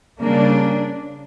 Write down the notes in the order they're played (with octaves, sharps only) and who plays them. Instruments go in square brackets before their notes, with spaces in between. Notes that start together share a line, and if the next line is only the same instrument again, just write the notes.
[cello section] C#3 G3 A#3 D4